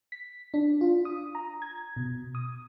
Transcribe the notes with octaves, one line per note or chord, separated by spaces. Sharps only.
B6
D4
F4
D#6
A#5
G#6
B2
D#6